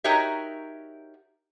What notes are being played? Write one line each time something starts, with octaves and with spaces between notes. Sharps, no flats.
D#4 F#4 G4 A#4 C#5 E5